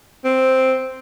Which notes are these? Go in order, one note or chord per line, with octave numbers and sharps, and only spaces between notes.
C4